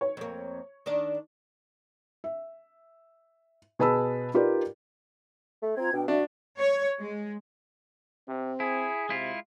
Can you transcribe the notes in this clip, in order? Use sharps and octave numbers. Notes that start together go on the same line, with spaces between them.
C#5
F2 A#3
D#3 D4 D5
E5
B2 G#4 B4 A5 B5 E6
D#4 F4 G4 A#4 B4 D5
A3
C4 F4 A#5 G#6
B2 D4 G5
D4 F#4 E5
C#5
G#3
C3 C4
E4 G#4
C3 G#3 E4 F4